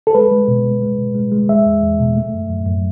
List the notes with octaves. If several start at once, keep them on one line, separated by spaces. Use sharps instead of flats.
A4
G#3 B4
G#3
B2
G#3
G#3
B2
G#3
G#3
G#3 E5
E2
E2
B2
A3
F#2
F#2
F#2